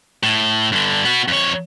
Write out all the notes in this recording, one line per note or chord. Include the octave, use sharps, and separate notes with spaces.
A2
G2 D3
B3 F#4
F2 C#5